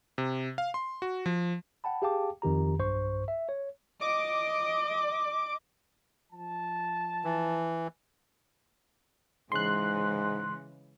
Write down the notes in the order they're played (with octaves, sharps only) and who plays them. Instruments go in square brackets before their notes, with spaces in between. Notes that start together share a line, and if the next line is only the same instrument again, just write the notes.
[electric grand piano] C3
F5
C6
F#4
F3
[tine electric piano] F#5 G5 A5 B5
G4 G#4 F5 G5 A5 D6
F2 D#3 G4 A#5
B1 G2 C5 C#6
E5
C#5
[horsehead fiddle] D#5 [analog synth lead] D6
[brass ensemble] F3 A5
[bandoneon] E3
[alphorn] G#2 [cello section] C#3 E3 G#3 [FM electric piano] C6 F#6